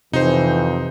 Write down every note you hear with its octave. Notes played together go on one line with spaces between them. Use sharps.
F2 C3 E3 D#4 C5